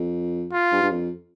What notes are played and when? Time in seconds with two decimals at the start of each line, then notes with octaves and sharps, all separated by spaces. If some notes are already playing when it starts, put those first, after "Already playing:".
Already playing: F2
0.52 F4
0.72 G2
0.82 G2
0.91 F2